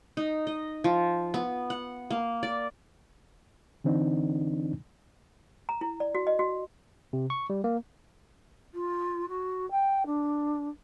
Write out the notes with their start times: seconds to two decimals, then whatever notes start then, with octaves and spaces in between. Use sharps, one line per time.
0.17 D#4
0.47 D#5
0.84 F3
1.34 B3
1.70 F#5
2.10 A#3
2.43 D5
3.84 D3 E3 C4 D4 D#4
5.69 A#5
5.81 E4
6.00 D5
6.15 F#4
6.27 D#5
6.39 F#4
7.13 C3
7.30 C#6
7.50 G3
7.64 A#3
8.74 F4
9.29 F#4
9.71 G5
10.06 D4